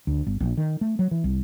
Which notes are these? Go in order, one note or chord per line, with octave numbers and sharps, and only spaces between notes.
D2
G1
A#1
D#3
A3
F#3
E3
C2